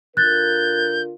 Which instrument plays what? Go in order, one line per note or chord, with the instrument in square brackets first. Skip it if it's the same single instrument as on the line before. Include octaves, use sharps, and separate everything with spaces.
[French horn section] D3 F4 A#4 [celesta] F#6 A6 [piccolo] G6